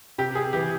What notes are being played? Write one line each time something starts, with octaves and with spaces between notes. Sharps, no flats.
C3 G4
G#4
E3 G4